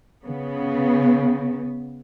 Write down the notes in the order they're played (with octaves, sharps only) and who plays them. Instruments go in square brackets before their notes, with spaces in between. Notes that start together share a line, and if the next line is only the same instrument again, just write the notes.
[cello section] C#3 B3